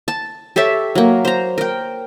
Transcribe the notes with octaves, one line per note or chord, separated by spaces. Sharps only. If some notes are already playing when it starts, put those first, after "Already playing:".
A5
G4 A4 C#5 E5
F#3 A#3
C5 A#5
A#4 G5